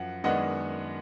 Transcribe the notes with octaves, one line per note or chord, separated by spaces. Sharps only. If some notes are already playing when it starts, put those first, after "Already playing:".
Already playing: F#2 F3 F#5
F#2 D#3 G#3 B3 D4 D#5 F#5